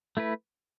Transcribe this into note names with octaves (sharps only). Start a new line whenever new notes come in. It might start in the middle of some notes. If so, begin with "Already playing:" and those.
A3 E4 B4